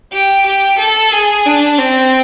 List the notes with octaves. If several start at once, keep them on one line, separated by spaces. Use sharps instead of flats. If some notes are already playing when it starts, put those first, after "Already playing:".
G4
G4
A4
G#4
D4
C4